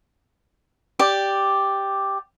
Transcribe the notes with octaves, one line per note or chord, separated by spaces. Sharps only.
G4 D5 D6